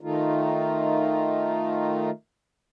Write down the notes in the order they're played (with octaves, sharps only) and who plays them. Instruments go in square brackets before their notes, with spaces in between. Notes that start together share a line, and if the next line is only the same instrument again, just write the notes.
[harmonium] D#3 A3 D#4 F4